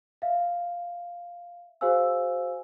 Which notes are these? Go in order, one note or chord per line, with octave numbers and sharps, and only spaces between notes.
E5 F5
F#4 G#4 C5 F5 G#5 E6